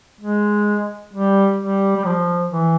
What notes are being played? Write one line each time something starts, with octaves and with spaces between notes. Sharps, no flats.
G#3
G3
G3
G3
F3
E3